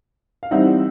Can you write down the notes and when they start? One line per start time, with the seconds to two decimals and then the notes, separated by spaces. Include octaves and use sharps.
0.43 F5
0.51 E3 G3 C4 D#4 E5 F#5